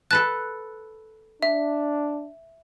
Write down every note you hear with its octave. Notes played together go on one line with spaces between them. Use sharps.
A4 B4 A5 F#6
D4 E5